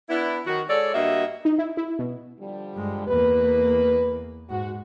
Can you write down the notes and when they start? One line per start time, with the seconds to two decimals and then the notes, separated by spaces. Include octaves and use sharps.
0.09 B3 D4 E4
0.46 D#3 F#4
0.69 G#3 A4 C#5 D5
0.94 G2 A#3 F#4 D#5 E5
1.45 D#4
1.58 E4
1.77 E4
1.99 B2
2.39 D3 F3 G3
2.74 G2 G#3
3.07 E2 A#3 B4
4.50 G#2 F#4